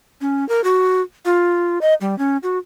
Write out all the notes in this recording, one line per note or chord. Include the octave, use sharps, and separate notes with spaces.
C#4
A#4
F#4
F4
D#5
G3
C#4
F#4